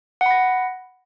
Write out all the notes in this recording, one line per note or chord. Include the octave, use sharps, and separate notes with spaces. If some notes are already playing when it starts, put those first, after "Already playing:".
F#5 B5 A#6